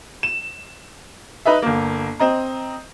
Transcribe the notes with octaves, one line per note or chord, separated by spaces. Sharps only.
E7
D#4 B4 D#5 E5
G1 A#3
C4 D#5 A#5